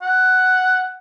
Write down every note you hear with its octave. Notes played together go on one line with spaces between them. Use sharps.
F#5